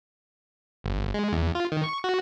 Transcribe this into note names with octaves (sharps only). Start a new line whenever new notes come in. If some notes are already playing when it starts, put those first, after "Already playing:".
G1
G#3
E2
F4
D#3
C#6
F#4